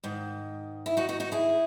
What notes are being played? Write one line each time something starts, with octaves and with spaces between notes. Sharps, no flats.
G#2 D#3
E4
D#4 F#4
D#4 F#4
D#4 F#4
E4 G#4